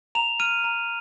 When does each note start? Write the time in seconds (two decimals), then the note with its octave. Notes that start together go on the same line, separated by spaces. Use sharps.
0.15 A#5 F7
0.40 F6 D#7
0.64 A#5